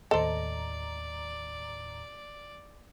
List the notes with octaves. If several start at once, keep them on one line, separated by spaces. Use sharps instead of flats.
D#2 A2 A4 C5 D5 D#5 A#5